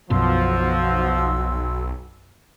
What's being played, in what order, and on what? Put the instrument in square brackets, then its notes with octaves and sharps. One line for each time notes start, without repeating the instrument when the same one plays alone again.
[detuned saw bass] B1 [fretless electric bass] F#2 B2 [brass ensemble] F3 [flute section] F#4 C6 E6